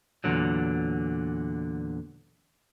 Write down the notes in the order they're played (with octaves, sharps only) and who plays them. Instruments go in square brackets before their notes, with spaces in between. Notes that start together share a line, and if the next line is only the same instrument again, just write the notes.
[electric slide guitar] E2 A#2 D3 F#3